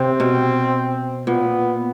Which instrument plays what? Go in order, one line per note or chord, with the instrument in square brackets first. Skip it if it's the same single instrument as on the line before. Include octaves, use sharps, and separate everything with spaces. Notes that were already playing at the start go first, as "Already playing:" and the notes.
Already playing: [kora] C3 [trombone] C4
[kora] B2
[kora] A#2 [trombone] B3